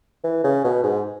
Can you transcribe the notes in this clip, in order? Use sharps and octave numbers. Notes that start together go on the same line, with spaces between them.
E3
C#3
B2
G#2